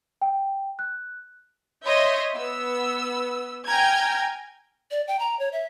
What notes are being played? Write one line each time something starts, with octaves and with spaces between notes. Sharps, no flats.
G5
F#6
C#5 D#5 E5 C6 G6
B3 E6
G5 G#5 A#5 F6 G6 G#6
D5
G5
A#5
C#5
E5